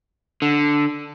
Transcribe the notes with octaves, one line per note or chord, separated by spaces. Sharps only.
D3